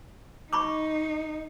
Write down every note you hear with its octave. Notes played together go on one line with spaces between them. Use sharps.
D#4 B5 C#6 D6